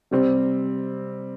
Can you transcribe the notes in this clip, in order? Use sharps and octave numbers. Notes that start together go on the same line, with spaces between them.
C3 G3 C4